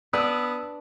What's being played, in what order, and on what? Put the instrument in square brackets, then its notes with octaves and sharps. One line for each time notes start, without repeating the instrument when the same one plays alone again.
[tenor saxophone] B3 [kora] D4 B4 [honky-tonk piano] D#6 E6